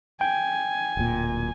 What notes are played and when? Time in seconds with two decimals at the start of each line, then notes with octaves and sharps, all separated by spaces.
0.21 G5 G#5
0.97 D1 A#2